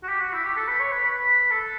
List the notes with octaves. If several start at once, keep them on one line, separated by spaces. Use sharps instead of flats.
F#4
G4
F#4
E4
G4
A4
B4
C#5
B4
B4
A4